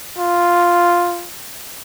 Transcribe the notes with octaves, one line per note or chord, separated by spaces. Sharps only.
F4